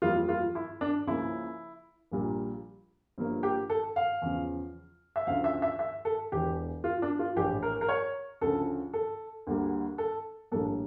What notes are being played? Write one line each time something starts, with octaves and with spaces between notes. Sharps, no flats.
F2 E3 G3 A#3 F4
F4
E4
D4
C#2 C#3 F3 A#3 E4
A#1 A#2 G3 A#3
G1 G2 F3 A#3
G4
A4
F5
E2 C#3 F3
E5
D2 C#3 F3 F5
E5
E5
E5
A4
E1 E2 E3 G4
F4
D4
F4
A#1 A2 E3 G4
A#4
A#4
C#5
D2 C#3 F3 A4
A4
D2 D3 G3 A#3
A4
A#1 A2 G3 A#3 A4